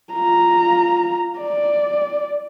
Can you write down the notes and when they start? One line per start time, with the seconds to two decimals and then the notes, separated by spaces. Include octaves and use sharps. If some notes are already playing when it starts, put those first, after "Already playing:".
0.13 F4 A#5
1.40 D5